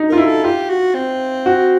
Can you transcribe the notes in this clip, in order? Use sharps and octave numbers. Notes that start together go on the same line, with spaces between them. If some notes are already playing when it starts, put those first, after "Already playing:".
Already playing: D#4
F4 A#4
E4
A4
F4 G4
F#4
C4
F#4